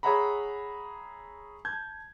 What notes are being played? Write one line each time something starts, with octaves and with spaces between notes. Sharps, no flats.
G#4 C#5 E5 F#5 A#5 B5
A5 G6 G#6